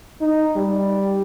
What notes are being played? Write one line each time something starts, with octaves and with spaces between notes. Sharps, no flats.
D#4
G3